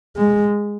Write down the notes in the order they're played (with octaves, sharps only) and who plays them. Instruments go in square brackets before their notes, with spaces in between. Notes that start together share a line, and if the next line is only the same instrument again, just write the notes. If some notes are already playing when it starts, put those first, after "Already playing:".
[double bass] G#3